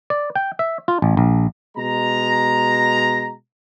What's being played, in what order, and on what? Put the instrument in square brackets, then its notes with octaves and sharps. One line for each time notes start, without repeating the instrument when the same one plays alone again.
[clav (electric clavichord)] D5
G5
E5
F4
A1
A#1
[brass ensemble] B2 G#3 A#5